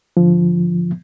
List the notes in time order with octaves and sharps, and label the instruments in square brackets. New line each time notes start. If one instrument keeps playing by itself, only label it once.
[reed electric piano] G#2 D3 F3